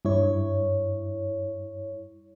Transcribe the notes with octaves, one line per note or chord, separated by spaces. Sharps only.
G2 E4 C#5